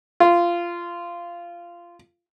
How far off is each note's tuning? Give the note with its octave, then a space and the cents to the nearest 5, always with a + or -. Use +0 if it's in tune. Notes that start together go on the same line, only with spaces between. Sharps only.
F4 -15